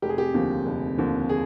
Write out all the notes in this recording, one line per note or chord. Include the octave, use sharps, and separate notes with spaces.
F1 G4
G#4
G4
D#2 D3 F3
F1
D#2 D3 F3
G#4